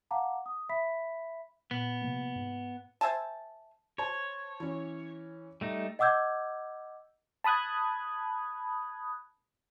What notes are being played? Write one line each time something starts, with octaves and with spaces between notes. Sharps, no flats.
F5 F#5 A5 A#5 D6
D#6
E5 B5 B6
A#2 B3
C3 F3 A#3
G#2
C5 E5 G#5 A5
C5 C#5 A5
E3 C#4
G3 A3 D#4
D#5 F#5 D6 E6 G6 G#6
A5 B5 D#6 F#6 G#6